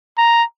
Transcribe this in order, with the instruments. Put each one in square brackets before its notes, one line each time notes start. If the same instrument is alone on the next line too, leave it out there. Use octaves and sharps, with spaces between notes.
[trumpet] A#5